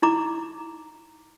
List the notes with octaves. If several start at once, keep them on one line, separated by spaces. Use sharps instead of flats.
D#4 E4 A#5 D6